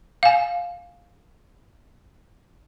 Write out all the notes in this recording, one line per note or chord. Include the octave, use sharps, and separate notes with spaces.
F5 G#5